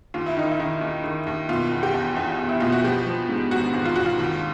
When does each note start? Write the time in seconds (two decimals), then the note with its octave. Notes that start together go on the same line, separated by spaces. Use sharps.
0.14 D#2 F4
0.26 E4
0.37 D#3 D#4
0.51 E4
0.60 D#3
0.81 D#2
1.04 D#3
1.27 D#2
1.49 B2 F4
1.72 E2
1.83 G4
1.94 E2
2.17 E2
2.39 E2
2.49 E4
2.60 B2 F4
2.72 F#4
2.84 F3 G4
3.07 F3
3.29 G#2
3.51 G#1 F#4
3.74 G#1
3.85 F4
3.96 G#1 F#4
4.06 F4
4.19 D#2